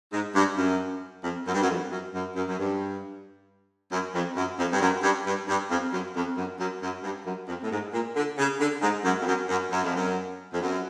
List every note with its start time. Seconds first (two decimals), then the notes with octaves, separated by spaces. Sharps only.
0.13 G#2
0.35 G2
0.57 F#2
1.24 F2
1.47 F#2
1.54 G2
1.62 F#2
1.70 F2
1.91 F#2
2.14 F#2
2.36 F#2
2.48 F#2
2.58 G2
3.92 F#2
4.15 F2
4.36 F#2
4.59 F2
4.72 G2
4.81 F#2
5.03 G2
5.26 G2
5.48 G2
5.71 F2
5.92 F#2
6.15 F2
6.37 F#2
6.60 F#2
6.82 F#2
7.03 G2
7.26 F#2
7.48 F2
7.64 A2
7.71 G#2
7.93 A#2
8.16 D3
8.38 C#3
8.60 D3
8.82 G#2
9.05 F#2
9.21 F2
9.27 F#2
9.49 F#2
9.71 F#2
9.83 F2
9.96 F#2
10.53 F2
10.61 F#2